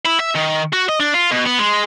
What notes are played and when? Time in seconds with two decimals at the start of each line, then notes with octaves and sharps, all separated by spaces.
0.06 E4
0.20 E5
0.36 D#3
0.73 F#4
0.89 D#5
1.00 D4
1.14 F4
1.31 B2
1.46 B3
1.59 G#3